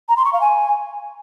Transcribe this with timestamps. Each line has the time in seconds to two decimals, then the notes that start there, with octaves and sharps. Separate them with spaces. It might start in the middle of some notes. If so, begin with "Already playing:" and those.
0.09 A#5
0.17 C6
0.25 C#6
0.33 F5
0.41 G#5